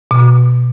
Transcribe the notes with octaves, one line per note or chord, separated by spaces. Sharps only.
B2